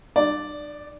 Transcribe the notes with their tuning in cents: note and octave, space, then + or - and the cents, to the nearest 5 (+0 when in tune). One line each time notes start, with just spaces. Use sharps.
D4 +45 D5 -5